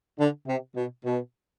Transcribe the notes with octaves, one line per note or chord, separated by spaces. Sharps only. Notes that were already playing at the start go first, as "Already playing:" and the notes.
D3
C3
B2
B2